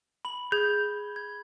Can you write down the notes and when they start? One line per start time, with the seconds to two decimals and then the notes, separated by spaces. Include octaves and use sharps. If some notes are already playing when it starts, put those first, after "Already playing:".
0.25 B5 F#7
0.52 G#4 G6 G#6
1.16 G#6